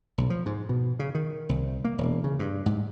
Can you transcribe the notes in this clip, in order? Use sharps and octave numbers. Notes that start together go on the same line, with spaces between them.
B1
F3
G#2
B2
C#3
D#3
C2
A#3
E1
C#3
G2
G#2